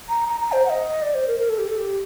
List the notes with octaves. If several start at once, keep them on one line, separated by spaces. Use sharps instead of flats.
A#5
A#5
A#5
C5
F#5
D#5
D5
C5
A#4
A#4
A4
G4
A4
G4